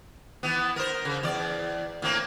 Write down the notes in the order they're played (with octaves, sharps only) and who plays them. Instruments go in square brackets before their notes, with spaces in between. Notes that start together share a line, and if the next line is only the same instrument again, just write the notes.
[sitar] E3 B3
A#4 C5
C#3
E2 D5
A2 A#3 C4